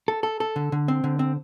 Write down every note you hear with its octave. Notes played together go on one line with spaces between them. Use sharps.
A4
A4
A4
D3
D3
C4
D3
C4